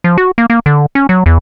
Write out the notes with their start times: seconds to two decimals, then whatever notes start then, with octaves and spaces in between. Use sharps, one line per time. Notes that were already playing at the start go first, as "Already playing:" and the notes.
0.04 F3
0.18 F#4
0.38 A#3
0.50 A#3
0.66 D3
0.95 C#4
1.09 F#3
1.26 E2